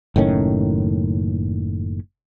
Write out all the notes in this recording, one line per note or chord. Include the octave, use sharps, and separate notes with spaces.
F#1 A2 D#3 C#4